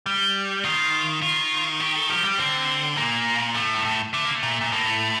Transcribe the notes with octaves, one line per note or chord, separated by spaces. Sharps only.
G3
D#3 F4
D#3 F4
G4
A4
F3 G4
G3 G4
D3 C4
A#2 A#3
A2 A3
G2
A2
D3 A3
A#3
A3
A#2
A#2
A2 A#3
A3